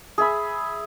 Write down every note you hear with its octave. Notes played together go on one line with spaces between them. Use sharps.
G#4 E5 B5